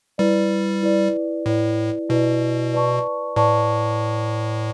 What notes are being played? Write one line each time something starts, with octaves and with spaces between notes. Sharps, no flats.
G3 E4 B4 D5
E4 B4 D5
A2 E4 B4 D5
B2 E4 B4 D5
B4 D5 A5 C#6
A2 B4 D5 A5 C#6